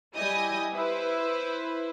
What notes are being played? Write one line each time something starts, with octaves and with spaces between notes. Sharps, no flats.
G3 E4 G4 D#5 G#5 D#6
E4 B4 C5